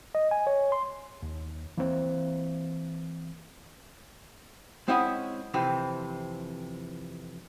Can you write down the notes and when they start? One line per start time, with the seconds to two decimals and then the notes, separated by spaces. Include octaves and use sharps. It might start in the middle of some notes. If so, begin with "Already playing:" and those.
0.15 D#5
0.31 G#5
0.47 C#5
0.72 C6
1.22 D#2
1.77 E3 A#3 C4
4.88 G#3 C4 C#4 E4 D#5 F#5
5.54 F2 C3 E3 C4